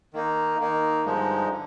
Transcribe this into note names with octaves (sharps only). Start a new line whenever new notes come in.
D#3 A#3 D#4
D#3 A#3 D#4
G2 D3 F3 G#3 D#4
D3